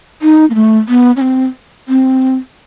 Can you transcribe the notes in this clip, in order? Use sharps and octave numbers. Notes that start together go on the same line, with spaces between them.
D#4
A#3
A3
B3
C#4
C4
C4